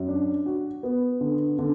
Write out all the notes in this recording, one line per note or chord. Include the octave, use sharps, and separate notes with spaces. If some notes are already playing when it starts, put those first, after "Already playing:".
Already playing: F#2
D4
F#4
B3
D3
D3